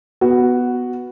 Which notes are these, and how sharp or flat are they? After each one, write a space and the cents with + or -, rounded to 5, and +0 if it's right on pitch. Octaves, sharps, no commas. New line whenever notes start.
B3 +0 F#4 +0